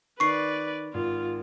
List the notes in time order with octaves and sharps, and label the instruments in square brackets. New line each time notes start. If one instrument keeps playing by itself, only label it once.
[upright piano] D#3 [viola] B4 D5 [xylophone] C#6 C7
[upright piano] G#1 [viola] F4